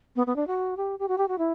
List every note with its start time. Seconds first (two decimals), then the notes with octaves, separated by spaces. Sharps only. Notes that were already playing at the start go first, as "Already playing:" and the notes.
0.16 B3
0.27 B3
0.36 D4
0.47 F#4
0.77 G4
0.99 G4
1.08 F#4
1.18 G4
1.28 F#4
1.38 E4